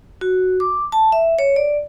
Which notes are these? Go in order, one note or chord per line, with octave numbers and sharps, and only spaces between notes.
F#4
D6
A5
E5
C#5
D5